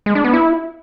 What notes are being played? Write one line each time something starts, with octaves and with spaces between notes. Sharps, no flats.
G#3
D4
B3
E4